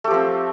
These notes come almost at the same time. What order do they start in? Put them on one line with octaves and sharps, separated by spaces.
A3 G4 F3 C4